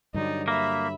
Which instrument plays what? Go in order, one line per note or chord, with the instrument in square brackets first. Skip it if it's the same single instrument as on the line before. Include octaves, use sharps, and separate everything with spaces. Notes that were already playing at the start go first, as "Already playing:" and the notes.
[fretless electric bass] G2 D3 F#3 [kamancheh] D#4 D5
[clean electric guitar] A#3 [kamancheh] E5 B5